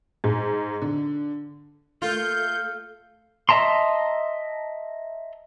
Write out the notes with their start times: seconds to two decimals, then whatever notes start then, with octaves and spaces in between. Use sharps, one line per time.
0.24 G#2
0.82 D3
2.02 A3 A#3 F4 A4 G6
3.49 D#5 E5 A5 A#5 C6